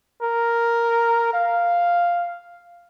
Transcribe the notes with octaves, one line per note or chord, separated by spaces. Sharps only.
A#4
F5